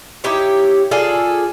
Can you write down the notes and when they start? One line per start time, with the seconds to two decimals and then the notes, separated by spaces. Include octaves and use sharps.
0.24 D#4 E4 G4 C#5
0.91 F4 G#4 A4 D5